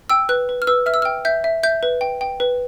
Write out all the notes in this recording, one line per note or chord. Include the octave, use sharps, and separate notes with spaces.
G5 E6
B4 F#6
B4
F6
B4 E6
E5 F6
E6
G5 F6
E5 G6
E5
E5 G6
B4
G5
G5
B4